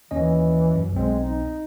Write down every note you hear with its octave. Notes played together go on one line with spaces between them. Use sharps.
D#2 E3 C#4 D#5
F#2
B1 G#3 C4
D#4